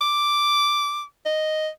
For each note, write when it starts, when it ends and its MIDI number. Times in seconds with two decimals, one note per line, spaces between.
0.01 1.02 86
1.26 1.68 75